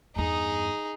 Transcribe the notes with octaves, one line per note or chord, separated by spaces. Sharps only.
E2 G2 D#4 G#4